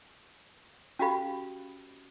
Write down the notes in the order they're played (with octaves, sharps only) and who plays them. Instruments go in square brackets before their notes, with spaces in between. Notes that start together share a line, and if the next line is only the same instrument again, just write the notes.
[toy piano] C#4 F#4 G4 F5 B5